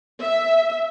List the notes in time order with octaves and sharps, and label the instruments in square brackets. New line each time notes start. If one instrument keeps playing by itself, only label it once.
[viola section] E5